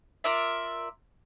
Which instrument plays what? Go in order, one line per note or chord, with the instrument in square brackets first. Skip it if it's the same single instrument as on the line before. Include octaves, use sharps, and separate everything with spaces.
[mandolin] F4 A#4 D5 E5